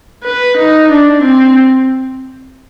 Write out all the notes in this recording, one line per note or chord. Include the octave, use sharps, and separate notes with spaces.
B4
D#4
D4
C4